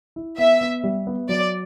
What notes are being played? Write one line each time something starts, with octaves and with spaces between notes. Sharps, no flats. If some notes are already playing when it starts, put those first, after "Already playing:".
E4
B3 E5
B3
G3
B3
F#3 D5